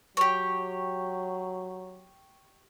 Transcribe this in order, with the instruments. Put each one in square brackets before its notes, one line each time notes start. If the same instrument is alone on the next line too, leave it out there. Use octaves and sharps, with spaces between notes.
[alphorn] F#3 [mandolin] G4 C#5